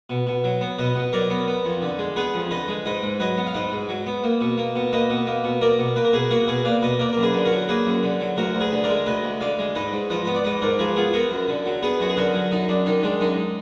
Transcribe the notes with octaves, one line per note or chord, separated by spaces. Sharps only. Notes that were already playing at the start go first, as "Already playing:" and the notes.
B2
B2
F#3
B3
B2 B4 D#5
B2
F#3 A#4 D5
B3
B3
F2
D3
G#3
B3 G#4 B4
F2
D3 B4 D#5
G#3
G#2 B4 D#5
G#2
F#3 B4 D#5
B3
F5
G#2 B4 D#5
G#2
F#3
B3
A#3
B2
A#3
B2
A#3 B4 D#5
B2
A#3
B2
A#3 A#4 D5
B2
A#3 B4
A#4
B2 G#4 B4
A#3 F#4 A#4
B2 G#4 B4
A#3 D5 F5
B2 B4 D#5
A#3 A#4 D5
F#2 A#4
G#4 B4
D3
F#4 A#4
F#3
A#3 G#4 B4
F#2
D3
F#3
D2 F#4 A#4
D2
G#4 B4
D3
A#4 D5
G#3
D2 B4 D#5
D2
D3 D5 F5
G#3
G#2 B4 D#5
G#2
F3 B4 D#5
B3 B4
D5
G#2 B4 D#5
G#2 A#4 D5
F3 G#4 B4
B3 F4 G#4
B3 F#4 A#4
F#2
D3
F#3
B3 G#4 B4
F#2 F#4
G#4
D3 F#4 A#4
F#3
F#2 D#4
F#2 D4
D#3 D#4
G#3 D4
F#2 D#4